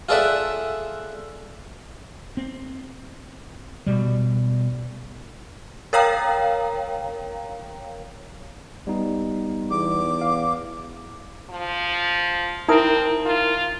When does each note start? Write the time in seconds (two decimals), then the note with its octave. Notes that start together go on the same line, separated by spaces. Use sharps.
0.09 F4 G#4 A4 D5 E5 F#5
2.37 C4
3.87 B2 G3
5.93 A#4 C#5 F5 G5 A#5
8.87 G3 B3 D#4
9.71 E2 D6
10.21 F5
11.50 F3
12.69 C4 D#4 E4 A#4 D#6
13.26 F4